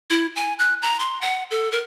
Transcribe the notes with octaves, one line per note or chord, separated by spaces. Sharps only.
E4
G#5
F#6
A#5
C6
F#5
A4
A#4